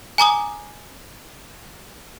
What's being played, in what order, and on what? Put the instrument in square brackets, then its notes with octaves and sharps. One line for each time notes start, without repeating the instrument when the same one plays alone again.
[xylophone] G#5 A#5 D6 D#6